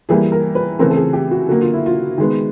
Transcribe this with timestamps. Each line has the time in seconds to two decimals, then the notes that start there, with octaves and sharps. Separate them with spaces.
0.09 E3 G3 A#3 G#4
0.32 A#4
0.55 B4
0.79 C#3 E3 A3 C4 A#4
0.90 A4
0.96 G#4
1.13 G4
1.31 F#4
1.48 D3 F#3 A#3 F#4
1.62 F4
1.74 E4
1.86 F4
2.18 D#3 G#3 B3